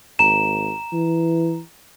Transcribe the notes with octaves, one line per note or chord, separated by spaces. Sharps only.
G#1 A#5 E7
E3